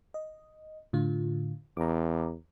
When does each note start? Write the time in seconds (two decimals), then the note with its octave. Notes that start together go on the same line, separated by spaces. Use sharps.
0.14 D#5
0.93 A2 D3 F4
1.77 E2 A#5 D6